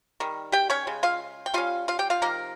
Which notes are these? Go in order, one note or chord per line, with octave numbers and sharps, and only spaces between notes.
D#3 G3
G4 G5
C#4 C#5
C#3 G#3
F4 F5
G5
G3 C#4 F4 F5
F4 F5
G4 G5
F4 F5
C3 F3 A#3 D#4 A#4